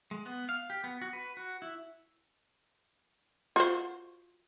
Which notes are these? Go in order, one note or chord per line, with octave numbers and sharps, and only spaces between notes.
G#3
B3
F5
G4
B3
F#4
B4
F#4
E4
F4 F#4 C5